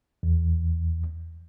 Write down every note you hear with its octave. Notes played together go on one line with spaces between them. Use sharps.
E2